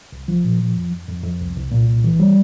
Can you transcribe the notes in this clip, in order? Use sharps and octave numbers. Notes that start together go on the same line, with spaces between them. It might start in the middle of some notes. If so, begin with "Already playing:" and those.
C2
F3
A#2
F3
F2
F2
F2
F2
C2
C2
A#2
C2
E3
G3